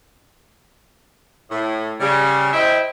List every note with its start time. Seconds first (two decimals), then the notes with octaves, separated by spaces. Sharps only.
1.50 A2
2.00 C#3 G3
2.53 E4 C5 D#5 E5 G5